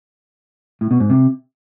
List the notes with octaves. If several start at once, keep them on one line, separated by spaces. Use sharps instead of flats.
A2
B2
G#2
C3